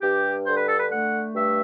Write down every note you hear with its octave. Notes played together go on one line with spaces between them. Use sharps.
G2 G4
D3 C5
B4
A4
B4
A3 F#5
G2 E5